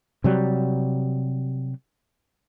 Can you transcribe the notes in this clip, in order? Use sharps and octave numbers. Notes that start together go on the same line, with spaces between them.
C3 F#3 G3